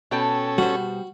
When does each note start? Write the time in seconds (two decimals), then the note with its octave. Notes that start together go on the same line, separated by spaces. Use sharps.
0.11 B2 C#4 A4 G5 A5
0.58 G3 F#4 C5